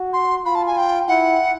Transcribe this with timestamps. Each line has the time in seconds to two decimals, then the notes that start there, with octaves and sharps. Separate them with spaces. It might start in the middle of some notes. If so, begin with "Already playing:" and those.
Already playing: F#4
0.13 C6
0.45 F4 B5
0.55 A5
0.67 G#5
0.77 G5
1.08 E4 F#5